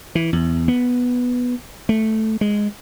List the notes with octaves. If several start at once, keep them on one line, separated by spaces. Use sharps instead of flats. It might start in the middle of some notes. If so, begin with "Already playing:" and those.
E3
E2
B3
A3
G#3